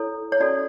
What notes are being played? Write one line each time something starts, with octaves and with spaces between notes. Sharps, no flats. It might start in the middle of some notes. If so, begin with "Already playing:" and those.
Already playing: E4 A4 C#5
C#5
C#4 F#4 A4 D5